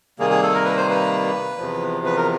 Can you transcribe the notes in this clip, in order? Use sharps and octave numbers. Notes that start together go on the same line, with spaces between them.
C3 D#3 G3 A#3 G#4
G#4
A4
A#4
B4
C5
B4
E2 C3 F3
B4
A#4